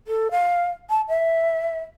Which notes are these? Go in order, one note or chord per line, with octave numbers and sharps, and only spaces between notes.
A4
F5
A5
E5